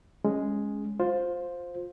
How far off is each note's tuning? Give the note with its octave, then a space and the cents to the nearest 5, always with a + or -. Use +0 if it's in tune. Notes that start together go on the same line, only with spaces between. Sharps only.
G#3 +0 C#4 +0
F4 +20 C5 +0